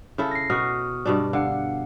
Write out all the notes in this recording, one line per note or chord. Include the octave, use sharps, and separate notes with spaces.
C#3 E4 A4
A#6 C7
B2 F#4 C#6 D#6 F6
G2 B2 D4
D3 F5 F#5